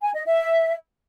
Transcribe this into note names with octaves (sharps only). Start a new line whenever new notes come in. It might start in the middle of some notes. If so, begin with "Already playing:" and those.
G#5
D#5
E5